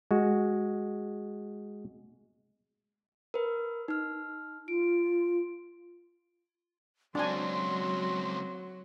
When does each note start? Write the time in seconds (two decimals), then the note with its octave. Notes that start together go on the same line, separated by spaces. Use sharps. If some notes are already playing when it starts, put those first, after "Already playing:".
0.11 G#3 F#4
3.34 A#4 B4
3.88 D#4 F6
4.68 F4 D7
7.15 C#2 F#3 C4 D4 F#4 G#5 C6